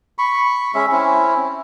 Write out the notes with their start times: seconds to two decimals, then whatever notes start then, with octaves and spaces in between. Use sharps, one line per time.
0.18 B5 C#6
0.75 G#3 C#4 E5
0.92 C4 C#4 E4